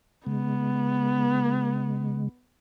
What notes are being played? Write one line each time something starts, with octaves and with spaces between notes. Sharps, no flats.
C#3 G#3 B3